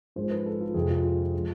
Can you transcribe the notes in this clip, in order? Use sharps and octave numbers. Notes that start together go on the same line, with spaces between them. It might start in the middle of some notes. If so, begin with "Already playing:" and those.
G#2 F3 G#3 C5
B4
A4
F4
F2 C3 F3 G#3 G#4
F4
F4
G#3